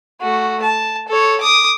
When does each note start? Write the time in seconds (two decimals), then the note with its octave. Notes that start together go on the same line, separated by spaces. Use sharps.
0.21 A3 F#4
0.62 A5
1.08 A4 C#5
1.41 D6 D#6